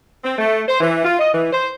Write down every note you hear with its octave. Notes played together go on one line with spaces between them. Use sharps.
C4
A3
C5
E3
F4
D#5
E3
C5